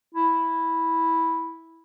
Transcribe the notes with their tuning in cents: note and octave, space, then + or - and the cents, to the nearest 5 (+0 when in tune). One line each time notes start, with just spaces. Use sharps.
E4 -5